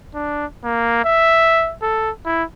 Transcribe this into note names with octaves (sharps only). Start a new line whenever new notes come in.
D4
A#3
E5
A4
E4